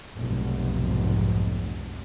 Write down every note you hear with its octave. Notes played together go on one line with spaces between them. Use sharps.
F1 B1 G#2